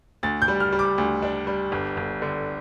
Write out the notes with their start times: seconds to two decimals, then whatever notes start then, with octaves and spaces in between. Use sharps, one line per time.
0.23 D2 A6
0.42 G6
0.48 G3
0.60 F6
0.72 G3
0.79 D6
0.98 D2
1.22 D4
1.47 G3
1.72 G1
1.97 G1
2.22 D3